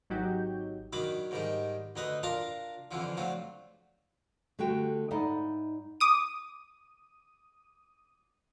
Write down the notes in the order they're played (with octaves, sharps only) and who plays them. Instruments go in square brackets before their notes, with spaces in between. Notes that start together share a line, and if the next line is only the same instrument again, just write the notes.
[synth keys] G#1 F#3 D#4 F#4 G4 G6
[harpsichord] D#3 F#3 D4 B5 D6
G#2 D#3 G3
D2 D#4 B4
D4 F4 A#4 A5 A#5
F2 D3 E3 F3
F3 F#3 A3 D4
[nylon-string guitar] D3 A3 F#4 G4 G5
G#2 D#4 E4 D5 F#5
[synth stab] D6 D#6 D#7